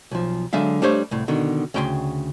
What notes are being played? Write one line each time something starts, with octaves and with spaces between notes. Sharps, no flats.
B1 F3
D3 F#3 G#3 E5 F5
G3 A3 D4 G4 C5 C#5
C2 A2
B2 D3 D#3
D2 C#3 G5 A#5 C6